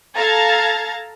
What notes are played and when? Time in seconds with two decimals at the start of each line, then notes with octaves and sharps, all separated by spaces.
0.15 A4 F5 A5 A#5 G#6 A6